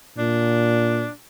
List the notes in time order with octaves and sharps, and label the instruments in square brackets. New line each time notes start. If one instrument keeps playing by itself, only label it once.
[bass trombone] A#2 [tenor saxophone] D4